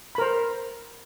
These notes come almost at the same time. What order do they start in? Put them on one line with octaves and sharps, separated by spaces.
B5 A#4 C5